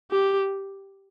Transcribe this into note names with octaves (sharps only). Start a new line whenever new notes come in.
G4